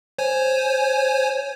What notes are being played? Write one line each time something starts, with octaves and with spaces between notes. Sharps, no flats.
C5 C#5 G#5